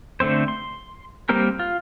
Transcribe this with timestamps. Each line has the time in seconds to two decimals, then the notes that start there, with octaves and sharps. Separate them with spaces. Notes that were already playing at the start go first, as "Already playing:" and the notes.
0.20 D3 A3 C4 C5
0.48 C6
1.29 G3 A#3 C4 G4 A#4
1.59 F4